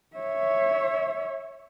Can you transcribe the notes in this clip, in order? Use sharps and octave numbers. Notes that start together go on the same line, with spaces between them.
C#5 E5